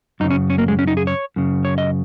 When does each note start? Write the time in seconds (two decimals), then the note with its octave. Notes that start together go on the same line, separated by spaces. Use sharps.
0.20 F#2 D#4
0.24 C#3
0.31 C#4
0.50 C#4
0.58 A#3
0.68 G#3
0.79 C#4
0.87 D#4
0.97 G#4
1.07 C#5
1.36 F#2 C#3
1.65 C#5
1.78 D#5